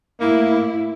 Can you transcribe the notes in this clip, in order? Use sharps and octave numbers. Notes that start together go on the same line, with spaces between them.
A2 A#3 E4